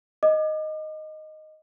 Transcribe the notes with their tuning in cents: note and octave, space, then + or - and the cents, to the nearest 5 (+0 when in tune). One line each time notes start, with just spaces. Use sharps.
D#5 -5 D6 +35